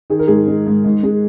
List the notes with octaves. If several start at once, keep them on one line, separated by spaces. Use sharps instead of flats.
D#3 G#4
A#4
G#2 G#4
G#3
G#2
G#2
G#3